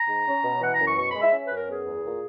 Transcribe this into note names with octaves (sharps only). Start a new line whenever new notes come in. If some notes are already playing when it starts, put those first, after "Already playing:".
Already playing: A#5
G#2
C#4
B2
E3 F#5
A#5
F#2
C#6
B2 C#6
G#3 B5
E5
C#4
B4
F#2
A#4
B3 G#4
E2
A#2